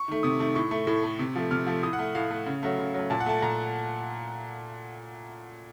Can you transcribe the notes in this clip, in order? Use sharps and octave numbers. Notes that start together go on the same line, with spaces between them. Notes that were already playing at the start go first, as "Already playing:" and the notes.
Already playing: C#6
D#3 A3
C3 D#6
D#3 A3
A2 C#6
A3
A2
A3
C3
F3 A3
C3 F6
F3 A3
A2 D#6
F#5
A3
A2 F5
A3
C#3
F#3 A3
C#3
F#3 A3
A#2 A5
F#5
A3 A5
A#2 A#5